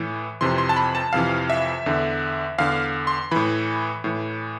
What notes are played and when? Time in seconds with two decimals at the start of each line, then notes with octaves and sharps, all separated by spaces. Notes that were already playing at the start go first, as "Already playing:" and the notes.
Already playing: A2 E3
0.41 F2 C3 E3 C6
0.58 C6
0.69 A5
0.76 B5
0.95 A5
1.13 F2 C3 E3 F5
1.50 E5
1.86 E2 D3
2.58 E2 D3 F5
3.07 C6
3.31 A2 E3 B5
4.04 A2 E3